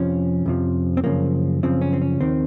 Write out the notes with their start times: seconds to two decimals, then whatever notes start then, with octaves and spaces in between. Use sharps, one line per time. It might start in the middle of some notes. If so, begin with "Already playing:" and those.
Already playing: F2 C3 F3 C#4
0.46 F2 C3 F3
0.97 C4
1.04 F#2 C#3 F3 A#3
1.63 F#2 C#3 F3 C4
1.81 C#4
1.93 C4
2.02 C#4
2.21 D#2 D#3 C4